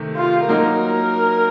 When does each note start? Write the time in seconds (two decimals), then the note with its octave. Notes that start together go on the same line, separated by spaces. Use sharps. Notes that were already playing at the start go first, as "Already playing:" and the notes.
Already playing: C3 D#3 A3
0.17 F4
0.48 F#3 A#3 D#4 A#4